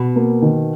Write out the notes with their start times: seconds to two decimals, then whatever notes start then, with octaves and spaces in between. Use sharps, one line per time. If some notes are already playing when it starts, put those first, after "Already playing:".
Already playing: B2
0.16 A#3
0.42 D#3